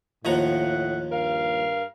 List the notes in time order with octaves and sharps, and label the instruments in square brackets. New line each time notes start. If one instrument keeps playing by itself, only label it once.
[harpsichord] D#2 F3 A#5 [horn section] A2 F#5
[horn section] G2 A#4 F5